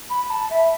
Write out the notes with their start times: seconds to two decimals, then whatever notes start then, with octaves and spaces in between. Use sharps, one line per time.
0.10 B5
0.30 A5
0.50 E5